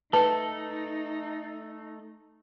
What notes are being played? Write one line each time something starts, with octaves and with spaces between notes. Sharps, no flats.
A3 D#4 A4 B4 A5